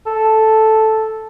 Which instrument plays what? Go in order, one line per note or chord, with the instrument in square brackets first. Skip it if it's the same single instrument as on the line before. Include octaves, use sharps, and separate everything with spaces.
[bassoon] A4